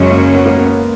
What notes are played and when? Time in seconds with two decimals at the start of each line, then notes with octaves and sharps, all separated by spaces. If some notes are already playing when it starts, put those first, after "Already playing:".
Already playing: F#2 C#3 F#3 G#3 C#4
0.11 A#3
0.34 B3
0.46 A#3
0.58 B3